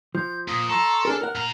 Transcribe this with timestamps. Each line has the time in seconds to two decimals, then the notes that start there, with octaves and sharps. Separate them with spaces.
0.15 F3 G6
0.48 A#2 D#6
0.69 A4 A#5 C6 C#6
1.05 D4 G#4 A#4 F6
1.21 A#4 F#5
1.35 A#2 A#5